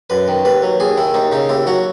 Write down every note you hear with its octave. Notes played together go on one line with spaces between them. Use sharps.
F#2 B4
D#3
D#2 B4
F#3
D#2 G#4
D#3 E4
D#2 D#4
C#3 D#4
D#2 E4
F#3 F#4